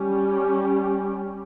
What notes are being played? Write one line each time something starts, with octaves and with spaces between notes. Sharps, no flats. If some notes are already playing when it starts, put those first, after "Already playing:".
Already playing: G3 C#4 G4